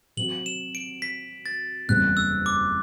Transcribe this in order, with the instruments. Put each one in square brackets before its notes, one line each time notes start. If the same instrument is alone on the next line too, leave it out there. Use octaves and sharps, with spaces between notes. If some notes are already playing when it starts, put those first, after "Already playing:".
[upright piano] C3 F#3 C4 F#4 [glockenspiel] F#7
[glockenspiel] E7
D7
B6
A6
[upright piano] F#1 E2 C3 G3 [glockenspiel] F#6
[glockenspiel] E6
D6